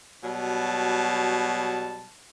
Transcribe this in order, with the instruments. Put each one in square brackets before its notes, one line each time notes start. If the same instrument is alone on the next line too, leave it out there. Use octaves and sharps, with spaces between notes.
[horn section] B2 F#3 G3 A5